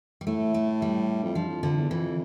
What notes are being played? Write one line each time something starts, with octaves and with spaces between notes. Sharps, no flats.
G3
A2 A3
A3
G3
F2
G2 F3
F2
F2 D3
E2
F2 E3